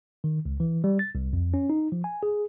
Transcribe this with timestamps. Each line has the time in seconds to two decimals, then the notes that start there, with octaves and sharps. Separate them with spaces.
0.24 D#3
0.45 C#2
0.60 E3
0.84 G3
0.99 A6
1.15 C2
1.33 F2
1.54 C#4
1.70 D#4
1.92 F3
2.04 G#5
2.23 G#4